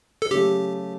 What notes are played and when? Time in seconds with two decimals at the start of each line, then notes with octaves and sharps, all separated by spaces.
0.22 A4
0.31 C#3 F#3 A3 G4